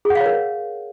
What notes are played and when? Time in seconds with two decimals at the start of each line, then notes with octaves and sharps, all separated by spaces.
0.05 G#4
0.10 F#5
0.15 F5
0.21 C#5
0.26 A#4